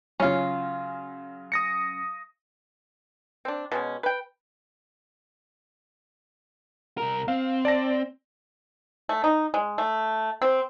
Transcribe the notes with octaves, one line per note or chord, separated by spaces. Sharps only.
C#3 F#3 C#4 F4
D#6 A#6 C#7
C4 D4
B2 G#3 C#4
B4 G5
C2 A#4
C4 F5
D5 A5 A#6
A3
D#4
G#3
A3
C4